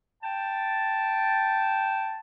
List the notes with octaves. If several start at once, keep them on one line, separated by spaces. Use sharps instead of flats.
G5 A5